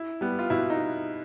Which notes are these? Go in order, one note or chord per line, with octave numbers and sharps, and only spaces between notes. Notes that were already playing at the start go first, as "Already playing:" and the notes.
Already playing: E4
G3 B3
F4
B2 E4
D#4